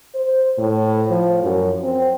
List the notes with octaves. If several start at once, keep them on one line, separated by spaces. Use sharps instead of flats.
C5
A2
F3
F#2
C4